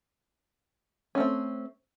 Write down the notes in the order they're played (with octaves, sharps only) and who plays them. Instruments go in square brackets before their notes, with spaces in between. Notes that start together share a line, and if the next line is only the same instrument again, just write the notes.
[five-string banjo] C#4
A3
C4